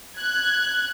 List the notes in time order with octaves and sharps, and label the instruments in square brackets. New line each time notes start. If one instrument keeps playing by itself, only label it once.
[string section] F#6 G#6